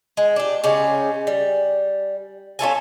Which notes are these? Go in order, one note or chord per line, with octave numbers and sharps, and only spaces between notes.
G#3
D4 G4
C#3 G#3 C#4 G4
G3
C#4 F4 A4 G#5